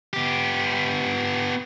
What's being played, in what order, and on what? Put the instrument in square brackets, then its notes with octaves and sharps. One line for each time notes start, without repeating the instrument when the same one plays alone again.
[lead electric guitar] B3 G4